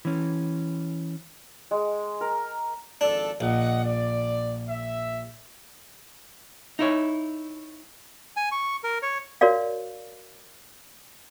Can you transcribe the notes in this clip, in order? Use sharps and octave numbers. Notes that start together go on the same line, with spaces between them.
E3 C#4
G#3
A#4
G#1 F3 D4 A4
A#1 D#5 F#5
D5
E5
D#4 E4 C#5
G#5
C#6
A#4
C#5
F#4 A#4 C#5 D5 F5